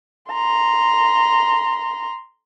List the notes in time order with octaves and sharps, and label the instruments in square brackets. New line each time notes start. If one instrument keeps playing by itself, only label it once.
[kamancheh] A#5 C6